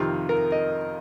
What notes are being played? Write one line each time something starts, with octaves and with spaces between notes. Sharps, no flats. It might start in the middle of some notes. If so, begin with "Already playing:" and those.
Already playing: F2 C3 D#3 F4
A#4
D#5